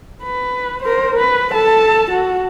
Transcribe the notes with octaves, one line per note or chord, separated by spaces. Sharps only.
B4
A#4 C5
B4
A4 A5
F#4